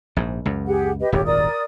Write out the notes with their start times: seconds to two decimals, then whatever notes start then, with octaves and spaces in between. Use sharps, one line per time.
0.16 A#1 G#2
0.46 C#2 F#2
0.67 G4 G#4 F#5
1.00 G4 B4 D#5
1.12 D#1 G#1 F2 G4 C#5
1.25 A#4 D5 D#6